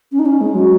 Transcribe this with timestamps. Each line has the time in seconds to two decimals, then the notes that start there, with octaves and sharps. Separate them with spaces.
0.12 C#4
0.19 D#4
0.26 C#4
0.41 G#3
0.54 F#3